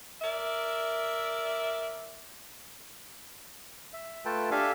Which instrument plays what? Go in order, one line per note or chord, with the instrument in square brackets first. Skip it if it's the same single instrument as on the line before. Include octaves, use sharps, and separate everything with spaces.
[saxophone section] A#4 D5 E5
[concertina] E5
A3 F4 A4 B4 G5 A5
D4 G4 A4 E5 F5 G#5